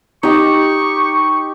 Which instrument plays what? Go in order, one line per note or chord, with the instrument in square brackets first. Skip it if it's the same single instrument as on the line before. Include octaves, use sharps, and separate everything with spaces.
[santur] D#4 G4 [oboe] C#6